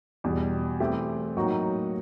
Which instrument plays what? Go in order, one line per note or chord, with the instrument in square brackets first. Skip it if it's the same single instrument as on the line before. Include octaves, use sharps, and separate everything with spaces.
[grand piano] E2 B2 G3
E3 A3 C4 E4 G4
A2 F#3 A#3 D#4 F#4